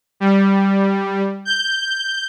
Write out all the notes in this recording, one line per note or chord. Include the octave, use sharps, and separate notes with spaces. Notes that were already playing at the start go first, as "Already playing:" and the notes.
G3
G6